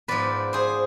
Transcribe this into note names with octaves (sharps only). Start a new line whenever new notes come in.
G#2 F3 B3 B4 D5
G#4 C5